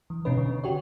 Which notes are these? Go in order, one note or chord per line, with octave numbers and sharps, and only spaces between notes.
E3
B2 C#4 D#4 B4
D3
F#4 G4 C#5